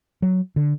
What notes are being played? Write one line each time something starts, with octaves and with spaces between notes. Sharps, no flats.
F#3
D3